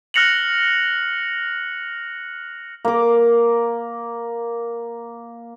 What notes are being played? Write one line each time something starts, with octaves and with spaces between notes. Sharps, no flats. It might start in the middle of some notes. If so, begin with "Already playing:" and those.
F6 F#6 A#6 C#7 F7 F#7
A#3 D6